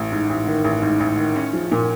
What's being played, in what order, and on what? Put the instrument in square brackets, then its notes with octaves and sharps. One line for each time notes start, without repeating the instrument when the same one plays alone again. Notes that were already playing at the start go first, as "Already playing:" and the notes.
Already playing: [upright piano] A1
G#2
A1
D#3
A1
G#2
A1
D#3
C#4
F3
A#2